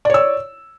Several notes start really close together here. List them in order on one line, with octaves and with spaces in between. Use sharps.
D5 C#5 E6